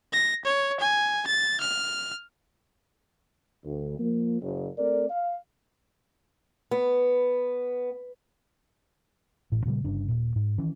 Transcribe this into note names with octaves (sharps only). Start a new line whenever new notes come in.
A#6
C#5
G#5
A6
F6
D2
F3 A#3
F#1
A3 C4 A4 A#4 D5
F5
B3
A1 A2
A#2 C#3 E3 G3
G1 G2 C#3 D4
D#1 A#2
G#2
D#3 E3 C#4